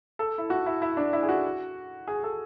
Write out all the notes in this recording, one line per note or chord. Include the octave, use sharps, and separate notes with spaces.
A4
E4
F#4
E4
E4
D4
E4
G#4
F#4
G#4
A4